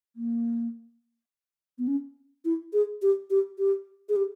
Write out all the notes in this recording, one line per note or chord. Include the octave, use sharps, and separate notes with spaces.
A#3
B3
C#4
E4
G#4
G4
G4
G4
G#4
G4